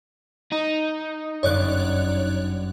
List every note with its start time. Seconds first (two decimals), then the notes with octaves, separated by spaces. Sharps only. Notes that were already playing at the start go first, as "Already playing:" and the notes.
0.52 D#4
1.43 G1 F#2 C#5 D5 F#6